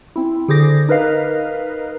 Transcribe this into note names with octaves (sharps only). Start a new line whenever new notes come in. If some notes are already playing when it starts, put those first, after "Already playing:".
C4 E4
D3 G4 G#4 C5 D6 A#6
D#4 A#4 B4 D#5 F5